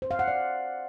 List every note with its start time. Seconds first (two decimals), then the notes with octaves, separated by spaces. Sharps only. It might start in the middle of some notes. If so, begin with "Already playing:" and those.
0.02 C5
0.11 F5
0.19 F#5
0.28 D5